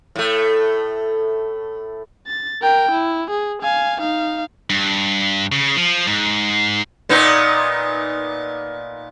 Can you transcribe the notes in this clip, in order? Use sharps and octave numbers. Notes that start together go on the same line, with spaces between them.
A2 A3
A6
A#4 G5
E4
G#4
F5 G#5
D#4 F5
G2
C#3
F3
G#2
A#2 B3 D#4